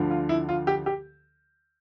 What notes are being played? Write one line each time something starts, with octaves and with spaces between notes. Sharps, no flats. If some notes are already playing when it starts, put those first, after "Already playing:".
Already playing: D2 D3 F3
F4
E4
F4
G4
G4